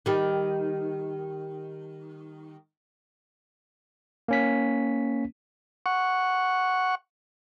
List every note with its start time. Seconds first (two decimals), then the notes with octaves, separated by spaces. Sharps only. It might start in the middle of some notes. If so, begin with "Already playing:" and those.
0.06 D#3 G3
4.28 A#3 C#4 B6
5.86 F#5 C#6